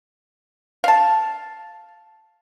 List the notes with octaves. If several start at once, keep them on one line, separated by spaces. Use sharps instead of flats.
F5 A5